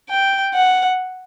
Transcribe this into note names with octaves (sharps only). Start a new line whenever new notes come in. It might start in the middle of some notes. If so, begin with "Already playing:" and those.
G5
F#5